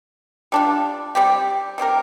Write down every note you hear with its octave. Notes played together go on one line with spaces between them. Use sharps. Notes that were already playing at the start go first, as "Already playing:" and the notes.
G3 D4 F4
G3 C4 G4
G3 C4 G4 A#4